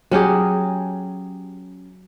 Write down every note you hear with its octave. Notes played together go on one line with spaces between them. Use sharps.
F#3 C#4 G4 G#4